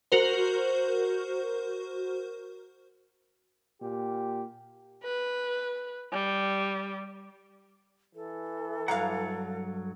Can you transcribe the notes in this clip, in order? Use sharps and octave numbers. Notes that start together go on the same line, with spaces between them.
F#4 A#4 C5
A#2 G4
B4
G3
E3 A4
G2 F#3 F5 F#5 A#5